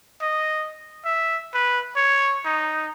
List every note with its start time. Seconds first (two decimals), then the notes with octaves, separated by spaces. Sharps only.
0.21 D#5
1.05 E5
1.54 B4
1.96 C#5
2.45 D#4